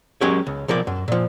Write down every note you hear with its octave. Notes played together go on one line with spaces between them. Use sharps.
F#3 G#3 C#4 G4 A#4 C#5
C#2
B1 F3 A#4 D5
F#2
A#2 F3